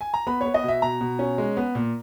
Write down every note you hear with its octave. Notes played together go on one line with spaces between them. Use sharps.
G#5
A#5
B3 B5
B3 C#5
D#5
B2
E5
B2 A#5
B2
C#4
G#3
B3
A#2